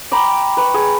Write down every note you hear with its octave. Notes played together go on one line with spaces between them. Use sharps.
G5 A#5 B5 D6
B4 C#6
G#4